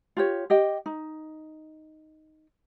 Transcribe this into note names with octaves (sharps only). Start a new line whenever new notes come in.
F4 G4 C#5
G4 D#5 G5
D#4